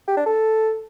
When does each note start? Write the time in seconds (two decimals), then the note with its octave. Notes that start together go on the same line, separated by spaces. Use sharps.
0.08 G4
0.17 D4
0.26 A4